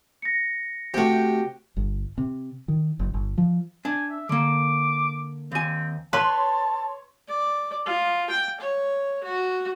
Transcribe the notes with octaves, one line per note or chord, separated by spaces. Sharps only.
A#6 C#7
C3 A3 F#4 G4
G1
C3
D#3
F#1
G1
F3
D4 G#5
E5
D3 A#3 D6
D#2 C4 G#5
B4 C#5 A5 C6
D5
F4
G5
C#5
F#4